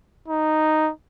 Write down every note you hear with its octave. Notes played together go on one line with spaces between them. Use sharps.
D#4